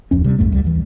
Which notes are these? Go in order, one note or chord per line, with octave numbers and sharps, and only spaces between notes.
D1 F2 C#4
C3 G3
A#1 F2 G#2 A3
C#2 G3
D#2 E3